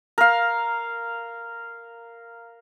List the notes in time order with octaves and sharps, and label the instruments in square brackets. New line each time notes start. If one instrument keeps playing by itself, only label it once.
[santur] A#4 F5